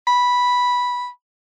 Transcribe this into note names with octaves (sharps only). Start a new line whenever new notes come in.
B5